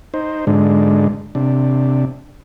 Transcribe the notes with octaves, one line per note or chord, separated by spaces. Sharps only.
D#4 C5
G#2 D3 G#3 D4
C3 D4